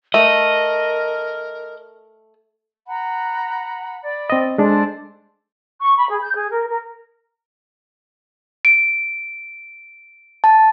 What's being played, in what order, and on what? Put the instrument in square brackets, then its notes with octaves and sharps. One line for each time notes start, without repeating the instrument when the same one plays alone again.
[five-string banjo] A3 [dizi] A#4 [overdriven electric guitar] D#5
[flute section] F#5 A#5 B5
D5 B5
[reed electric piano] C4 D#5
[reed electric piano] G#3 D4 [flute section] A4 C5 D5
[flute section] C#6
B5
G#4
G6
G#4
A#4
A#4
[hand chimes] D7
A5